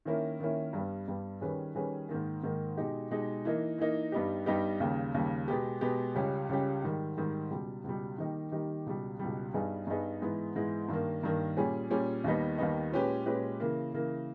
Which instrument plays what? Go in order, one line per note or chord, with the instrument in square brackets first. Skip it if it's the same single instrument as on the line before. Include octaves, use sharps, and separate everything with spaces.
[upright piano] D#3 A#3 C#4 E4
D#3 A#3 C#4 E4
G2 G3 B3
G2 G3 B3
D#3 G3 C#4 G#4 B4
D#3 G3 C#4 G#4 B4
G#2 D#3 A#3
G#2 D#3 A#3
B2 G#3 D#4 G4
B2 G#3 D#4 G4
E3 A#3 D#4
E3 A#3 D#4
G2 G3 B3 D#4 G4
G2 G3 B3 D#4 G4
D#2 C#3 G3
D#2 C#3 G3
B2 G#3 B3 G4
B2 G#3 B3 G4
C#2 C#3 G3 C#4 G4
C#2 C#3 G3 C#4 G4
G#2 D#3 G3
G#2 D#3 G3
C#2 B2 G3
C#2 B2 G3
D#3 G3 A#3 D#4 G4
D#3 G3 A#3 D#4 G4
C#2 B2 G3
C#2 B2 G3
G2 G3 B3 D#4 G#4
G2 G3 B3 D#4 G#4
G#2 E3 G#3 B3
G#2 E3 G#3 B3
G2 D#3 A#3
G2 D#3 A#3
A#2 G3 C#4 G#4
A#2 G3 C#4 G#4
D#2 D#3 G3 B3 D#4
D#2 D#3 G3 B3 D#4
A#2 G#3 C#4 G4 B4
A#2 G#3 C#4 G4 B4
C#3 E3 A#3
C#3 E3 A#3